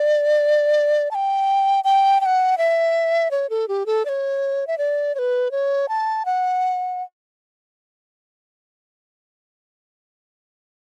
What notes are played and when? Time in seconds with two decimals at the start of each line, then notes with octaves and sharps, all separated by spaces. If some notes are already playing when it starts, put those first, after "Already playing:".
Already playing: D5
1.11 A5
1.15 G5
1.84 G5
2.21 G5
2.26 F#5
2.58 E5
3.31 C#5
3.50 A4
3.68 G4
3.86 A4
4.05 D5
4.09 C#5
4.67 E5
4.78 D5
5.15 C#5
5.19 B4
5.51 C#5
5.89 A5
6.25 F#5